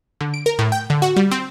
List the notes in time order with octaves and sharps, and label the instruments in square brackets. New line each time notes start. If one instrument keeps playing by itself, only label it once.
[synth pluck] D3
D7
A#4
A2
G5
D3
F#4
G3
C4